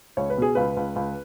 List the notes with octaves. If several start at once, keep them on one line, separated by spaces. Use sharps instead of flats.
C#2 C#5
B4
B2 G#4
C#2 B4
C#2
C#2